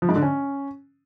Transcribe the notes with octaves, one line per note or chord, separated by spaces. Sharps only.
F3
G#2
D3
C#4